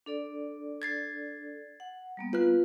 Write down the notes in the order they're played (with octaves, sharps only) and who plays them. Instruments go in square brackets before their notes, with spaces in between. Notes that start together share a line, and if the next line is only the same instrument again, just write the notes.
[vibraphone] D4 A4 D5
[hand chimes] G#6 A6 C7
[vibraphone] F#5
G3 A#3 B3
[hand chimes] F4 B4 F#6